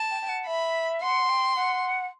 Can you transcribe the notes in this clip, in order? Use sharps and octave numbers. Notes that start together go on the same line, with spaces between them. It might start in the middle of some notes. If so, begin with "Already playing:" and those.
Already playing: A5
G5
G5
F#5
E5 B5
F#5 C6
G5
F#5